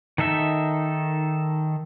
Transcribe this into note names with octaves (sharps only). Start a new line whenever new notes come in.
D#3 D#4 A4 E5